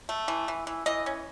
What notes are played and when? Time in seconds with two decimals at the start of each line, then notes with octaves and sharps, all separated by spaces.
0.09 A3
0.28 E3
0.48 E3
0.67 E3
0.86 E3 D#5
1.06 C#4